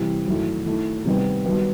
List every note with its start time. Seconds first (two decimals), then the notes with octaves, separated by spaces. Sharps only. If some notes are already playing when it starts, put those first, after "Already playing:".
Already playing: C3 E3 G3
0.27 F#2 D#3 A3 E4
0.66 D#3 A3 E4
1.05 C3 D#3 G3 B3
1.45 G2 D#3 F#3 B3 F#4